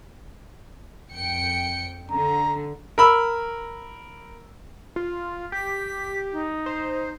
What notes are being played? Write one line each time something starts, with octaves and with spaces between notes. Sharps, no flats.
F2 G5 C#7
D3 A#5
A#4 B5 E6
F4
G4 B6
D#4
C5